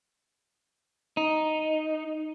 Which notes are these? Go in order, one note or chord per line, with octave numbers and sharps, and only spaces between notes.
D#4